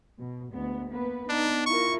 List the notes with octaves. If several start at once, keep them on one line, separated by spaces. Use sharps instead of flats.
B2
D2 G#3 B3
A#3 B3 B4
B3 D4 D#4
E4 F4 A#4 C#6